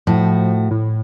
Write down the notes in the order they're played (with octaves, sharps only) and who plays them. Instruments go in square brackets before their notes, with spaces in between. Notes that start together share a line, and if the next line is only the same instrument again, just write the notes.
[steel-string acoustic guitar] A2 F#4 [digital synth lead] F3
[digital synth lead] A2